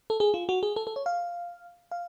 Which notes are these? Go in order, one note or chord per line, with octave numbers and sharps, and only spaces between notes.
A4
G#4
F4
F#4
G#4
A4
A4
C#5
F5
F5